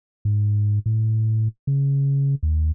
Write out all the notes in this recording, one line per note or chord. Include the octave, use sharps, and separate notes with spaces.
G#2
A2
C#3
D#2